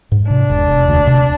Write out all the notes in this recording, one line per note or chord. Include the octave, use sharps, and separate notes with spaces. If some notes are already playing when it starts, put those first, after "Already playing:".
G#2
C3 D4
E1
E1
D2
C3